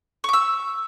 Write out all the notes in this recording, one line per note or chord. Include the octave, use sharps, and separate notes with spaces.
C#6 D6 E6